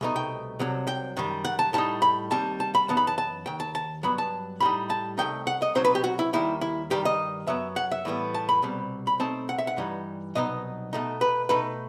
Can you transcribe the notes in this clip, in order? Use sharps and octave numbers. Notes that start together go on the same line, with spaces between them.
C2 B2 A3 D#4
G5
C2 C3 F#3
G5
F#2 D#3 G3
F#5
A5
A2 G3 D#4 A5
B5
D#2 D#3 G3 C4 A5
A5
B5
F#2 E3 B3 D#4 A5
B5
A5
A5
D#2 D#3 G5
A5
A5
G2 F#3 B3 B5
A5
A2 G3 D#4 B5
A5
C2 B2 A3 D#4 G5
F#5
D#5
B1 B2 F#3 C4 D#4 C5
B4
G4
F#4
E4
D#2 D#3 G3 E4
E4
G2 D#3 G3 G4
D#5
F#2 F#3 B3 E5
F#5
E5
A2 E3 G3 B3
A5
B5
C2 B2 G3 C4
B5
B1 B2 A3 C4 D#4 A5
F#5
E5
F#5
G2 E3 G3 D#4
C2 B2 F#3 B3 D#4 D#5
B2 A3 D#4
B4
B2 A3 D#4 B4